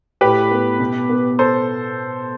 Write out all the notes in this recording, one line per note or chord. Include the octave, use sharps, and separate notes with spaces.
A2 G4 B4
B3
B2
B3
A4 C5